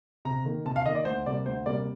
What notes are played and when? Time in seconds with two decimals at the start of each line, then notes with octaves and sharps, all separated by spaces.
0.25 C3 A#5
0.45 D#3 A#3
0.65 C3 A5
0.76 F5
0.85 D#3 D#5
0.89 A#3
0.95 D5
1.05 D2 C5
1.26 C3 G3 A#3 D5
1.46 D2 C5
1.66 C3 G3 A#3 D5